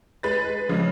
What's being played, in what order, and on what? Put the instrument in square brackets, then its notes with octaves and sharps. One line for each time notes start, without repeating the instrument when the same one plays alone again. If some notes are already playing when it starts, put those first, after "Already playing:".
[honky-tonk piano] G#3 B4 A6
[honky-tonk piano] C#3 [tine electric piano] F3 G#3